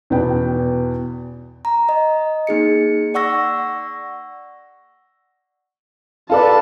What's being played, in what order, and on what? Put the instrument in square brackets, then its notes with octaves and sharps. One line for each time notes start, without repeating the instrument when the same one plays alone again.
[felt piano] E2 B2 B3 G5
[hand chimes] A#5
D#5
A#3 D#4 G#4 C#7
D5 F#5 C#6 E6 A#6
[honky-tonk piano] F4 A4 D5 [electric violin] B4 A5